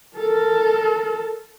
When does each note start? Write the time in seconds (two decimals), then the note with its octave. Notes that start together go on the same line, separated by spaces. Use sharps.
0.16 A4 A#4